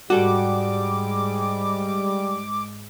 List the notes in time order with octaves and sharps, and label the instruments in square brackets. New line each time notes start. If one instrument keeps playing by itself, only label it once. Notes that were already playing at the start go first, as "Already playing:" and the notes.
[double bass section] G#2 G#3 [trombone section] G3 [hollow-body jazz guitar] F#4 A4 [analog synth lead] D6